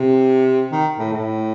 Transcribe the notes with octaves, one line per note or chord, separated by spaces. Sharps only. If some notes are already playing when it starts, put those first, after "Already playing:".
Already playing: C3
D#3
A2
A2